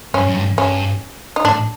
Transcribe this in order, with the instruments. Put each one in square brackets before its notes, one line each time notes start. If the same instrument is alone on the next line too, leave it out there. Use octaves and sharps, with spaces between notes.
[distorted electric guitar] G2 [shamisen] C#4
[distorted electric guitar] F#2
G2
[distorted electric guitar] G2 [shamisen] C#4
[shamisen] D#4
[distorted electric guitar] A2 [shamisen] D4